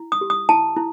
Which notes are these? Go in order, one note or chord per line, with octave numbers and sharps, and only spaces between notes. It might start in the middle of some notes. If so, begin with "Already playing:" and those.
Already playing: E4
D#6
G4
D#6
E4 A5
E4